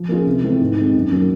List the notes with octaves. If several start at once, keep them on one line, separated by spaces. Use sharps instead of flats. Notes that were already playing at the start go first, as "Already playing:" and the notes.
Already playing: F3
A#3 C#4 F4 G#4
C3
E3 A3 C4
G#2
D#3 G#3 C4
F#2
D#3 F#3 A#3 C#4